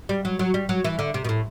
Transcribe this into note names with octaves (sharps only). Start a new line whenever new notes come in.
G3
F#3
F#3
G3
F#3
E3
D3
C3
B2
A2